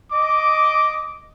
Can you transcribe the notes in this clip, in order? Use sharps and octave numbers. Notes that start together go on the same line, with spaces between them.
D#5 D6